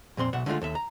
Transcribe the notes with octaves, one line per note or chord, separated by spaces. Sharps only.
F2 A#2 C4 C6
B1 B2 E5 F#5
D3 F3 G#3 A3 F4
D#2 A4 E5
A#5